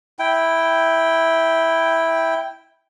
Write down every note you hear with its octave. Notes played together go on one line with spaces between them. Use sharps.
E4 G5